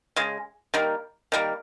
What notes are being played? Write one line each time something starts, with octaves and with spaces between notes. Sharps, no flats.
C#3 G#3
D#3 G3 A#3
D#3 G3 A#3